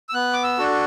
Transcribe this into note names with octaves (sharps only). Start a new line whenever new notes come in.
E6
B3 F#6
D6
E6
D4 F#4 A4